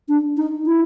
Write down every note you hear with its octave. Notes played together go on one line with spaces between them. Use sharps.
D4
D#4
E4